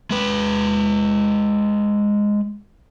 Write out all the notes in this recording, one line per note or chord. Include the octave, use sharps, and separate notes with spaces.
G#3 B4